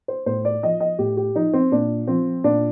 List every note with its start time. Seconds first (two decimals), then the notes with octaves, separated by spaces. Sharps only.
0.08 C5
0.26 A2 C5
0.45 D5
0.63 F3 D#5
0.80 D#5
0.99 A2 G4
1.17 G4
1.35 F3 D#4
1.53 C4
1.72 A#2 D4
2.07 F3 C4
2.44 A#2 D4